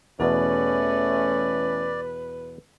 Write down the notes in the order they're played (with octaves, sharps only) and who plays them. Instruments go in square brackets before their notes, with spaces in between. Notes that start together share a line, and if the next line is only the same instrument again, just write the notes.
[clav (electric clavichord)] E2 B2 [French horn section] E3 A3 C#4 [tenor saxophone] B4 [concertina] D5